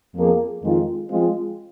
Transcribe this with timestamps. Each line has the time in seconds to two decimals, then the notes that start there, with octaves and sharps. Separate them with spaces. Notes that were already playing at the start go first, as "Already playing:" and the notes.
0.14 F2 F3 A#3 G#4
0.62 F2 D#3 G#3 F4
1.10 F3 G#3 C4 F4